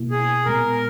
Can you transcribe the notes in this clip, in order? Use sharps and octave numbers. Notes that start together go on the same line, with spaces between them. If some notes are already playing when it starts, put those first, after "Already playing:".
Already playing: B2 A#3 E4
G#4
A#2 G#3 B3 A#4